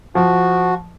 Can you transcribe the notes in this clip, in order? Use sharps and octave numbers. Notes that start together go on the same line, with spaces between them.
F3 F#4